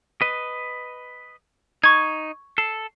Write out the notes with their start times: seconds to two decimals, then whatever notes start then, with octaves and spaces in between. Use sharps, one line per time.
0.22 B4 D#5
1.83 D#4 C#6 G#6
2.58 A4 C7